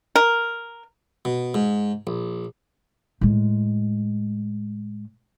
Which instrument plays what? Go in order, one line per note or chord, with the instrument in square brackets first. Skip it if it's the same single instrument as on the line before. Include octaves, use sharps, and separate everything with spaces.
[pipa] A#4
[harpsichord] B2
G#2
A#1
[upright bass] A2 G#3